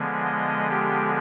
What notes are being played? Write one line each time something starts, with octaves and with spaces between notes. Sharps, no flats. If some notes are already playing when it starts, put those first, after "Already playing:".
Already playing: D3 F3 G#3 B3
D#5
G4